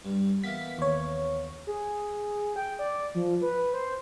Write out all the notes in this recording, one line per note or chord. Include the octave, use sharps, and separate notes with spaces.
G2
E3 A#3 B3 B6
D#2 C#5
G#4
G5
D5
F3
B4
C5